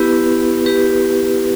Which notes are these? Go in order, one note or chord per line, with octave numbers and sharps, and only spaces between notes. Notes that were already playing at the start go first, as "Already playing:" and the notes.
Already playing: B3 E4 G4 B4
G4 B4